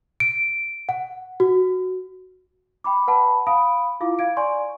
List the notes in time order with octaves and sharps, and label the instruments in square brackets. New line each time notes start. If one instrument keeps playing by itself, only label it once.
[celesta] D7
F#5
F#4
G5 B5 D6
B4 F#5 A5 B5
F5 B5 D#6 D7
E4 F4 F5 D6
F5 G#6 D7
D5 G#5 C6 C#6